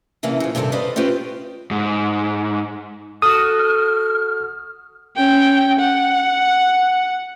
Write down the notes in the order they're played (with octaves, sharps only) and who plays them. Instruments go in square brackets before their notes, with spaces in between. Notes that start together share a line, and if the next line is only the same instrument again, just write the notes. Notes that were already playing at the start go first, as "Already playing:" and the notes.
[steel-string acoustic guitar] C3 E3 A#3 C#4 D4
C#3 F3
G2 C3 D#3 C#4 A4 A#4
B4 C5 D5 D#5 F5
C4 C#4 F4 G4 B4 C5
[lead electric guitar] G#2
[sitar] F#4 A4 [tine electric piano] D#6 [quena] F6
[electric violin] C#4 G5
F#5